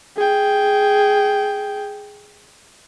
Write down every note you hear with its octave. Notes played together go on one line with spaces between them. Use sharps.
G#4 G5